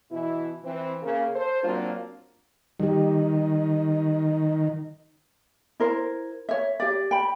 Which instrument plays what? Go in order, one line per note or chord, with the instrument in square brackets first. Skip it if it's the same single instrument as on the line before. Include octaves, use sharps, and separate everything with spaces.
[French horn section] B2 E3 E4
E3 C4
C#3 A#3
A4 C5
F#3 A#3 C4 D4 F4
[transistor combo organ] D#3 [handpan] G3 G4
[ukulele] E4 A#4 C5
C#5 E5
G4 D5
G5 B5